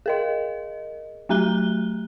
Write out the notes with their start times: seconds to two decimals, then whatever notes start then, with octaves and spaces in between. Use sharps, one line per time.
0.06 G#4 A#4 D#5
1.29 F#3 A3 G4 A#5 F#6 G7